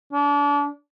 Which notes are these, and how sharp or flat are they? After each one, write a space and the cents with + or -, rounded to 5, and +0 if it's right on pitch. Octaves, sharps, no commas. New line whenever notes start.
D4 -35